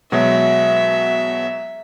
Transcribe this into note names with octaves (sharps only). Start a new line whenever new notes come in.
B2 F#3 G#3 E5